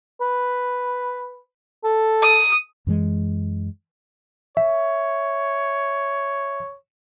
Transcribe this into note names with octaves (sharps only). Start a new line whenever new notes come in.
B4
A4
D#6
F#2 E3 G#3
C#5 E5